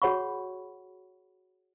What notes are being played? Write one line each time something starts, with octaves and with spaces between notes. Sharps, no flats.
F#4 G#4 C#5 F#5 B5 C#6